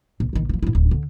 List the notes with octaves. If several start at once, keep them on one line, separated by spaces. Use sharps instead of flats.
B1
A#1 D#3
E3 F3
G#2 E4
D1
D3